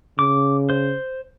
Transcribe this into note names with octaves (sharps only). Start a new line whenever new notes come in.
C#3 D6
C5